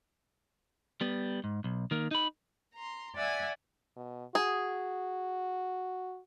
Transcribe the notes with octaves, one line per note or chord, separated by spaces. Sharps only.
G3 B3
G#2
B1
D#3 A#3
D#4 B5
A#5 C6
D5 E5 F#5 G#5 E6
B2
F#4 G#4